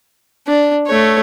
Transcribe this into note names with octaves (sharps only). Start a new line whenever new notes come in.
D4
A3 C#5